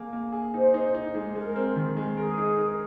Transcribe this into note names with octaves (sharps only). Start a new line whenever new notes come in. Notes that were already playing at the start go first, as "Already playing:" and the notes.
Already playing: A#3 G#4
A#3
G#4
D#4 C5
D#4
D#4
G#3
G#3 A#4
C4
D#3
G#3
G#4 A#4
D#4
A#4